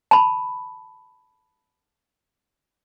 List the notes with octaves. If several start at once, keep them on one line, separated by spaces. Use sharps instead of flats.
A5 B5